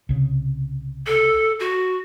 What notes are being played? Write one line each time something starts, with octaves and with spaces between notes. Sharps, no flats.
C2 C#3
A4
F#4